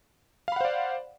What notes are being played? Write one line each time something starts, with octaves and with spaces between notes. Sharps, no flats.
C5 D5 F5 F#5 B5